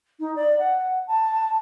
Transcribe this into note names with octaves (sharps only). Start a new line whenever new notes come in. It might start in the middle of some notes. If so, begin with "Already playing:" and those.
D#4
D5
F#5
A5